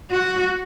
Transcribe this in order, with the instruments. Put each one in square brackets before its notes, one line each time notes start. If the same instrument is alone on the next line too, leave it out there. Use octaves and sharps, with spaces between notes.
[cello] F#4